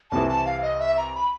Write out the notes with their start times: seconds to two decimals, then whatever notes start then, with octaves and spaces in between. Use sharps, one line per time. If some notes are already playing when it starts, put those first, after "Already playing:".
0.11 C2 C3 E3 A5
0.29 A5
0.46 F5
0.62 D#5
0.80 E5
0.97 A#5
1.15 B5